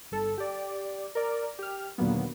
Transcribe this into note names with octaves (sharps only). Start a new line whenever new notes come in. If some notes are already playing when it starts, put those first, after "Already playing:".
G1 A4
G4 D5
A#4 D5
G4 F6
D#2 A#2 D3 F#3 A#3 B3